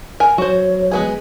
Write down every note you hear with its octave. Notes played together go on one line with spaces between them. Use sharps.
A#4 G#5
F#3 F#4 C5 C#5
G#3 B3 G#4